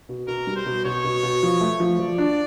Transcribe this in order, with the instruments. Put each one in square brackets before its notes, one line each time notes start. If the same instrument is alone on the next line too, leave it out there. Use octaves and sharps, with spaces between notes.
[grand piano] B2
[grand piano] B2 [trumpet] A#4
[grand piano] G3
[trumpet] C5
[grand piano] B2
[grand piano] B2 [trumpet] C#5
[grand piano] B2
B2
F3
A3
F3
[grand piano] F3 [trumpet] D5
[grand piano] D4